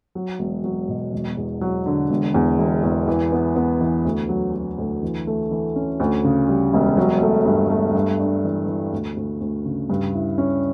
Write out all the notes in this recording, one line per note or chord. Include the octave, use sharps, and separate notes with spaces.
F#3
E1
F#3
B2
E1
E2
F#3
D3
E1
E2
E1
E2
E3
B3
B3
E3
D2
F#3
F#3
D2
E3
A3
E3
C#4
D2
C#3
G3
E1
F#3
A3
G2
A3
G2
D4
E3
E3
D2
D2
D2
C#3
G2
E4
C#4